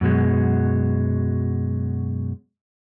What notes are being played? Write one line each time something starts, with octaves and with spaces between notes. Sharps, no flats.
F#2 B2 F#3 G#3